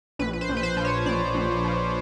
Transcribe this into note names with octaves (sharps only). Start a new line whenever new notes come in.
A#1 B4
B4
C5
A#1
B4
C5
F3
C#5
A#1 D5
A#1
F3